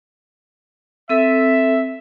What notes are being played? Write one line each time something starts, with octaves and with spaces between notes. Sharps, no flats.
C4 A4 E5